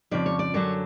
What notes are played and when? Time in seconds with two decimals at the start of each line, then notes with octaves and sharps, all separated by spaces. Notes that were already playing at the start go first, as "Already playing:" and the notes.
0.11 F2 C#3 F3 D5
0.26 C#5
0.39 D5
0.54 F#2 D3 F#3 C#5